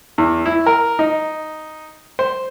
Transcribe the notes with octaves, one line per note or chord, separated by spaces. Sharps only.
E2
E4
A#4
D#4
C5